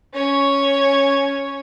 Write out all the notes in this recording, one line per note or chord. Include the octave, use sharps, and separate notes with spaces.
C#4 C#5